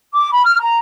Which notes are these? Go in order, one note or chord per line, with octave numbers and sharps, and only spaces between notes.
D6
B5
F6
A#5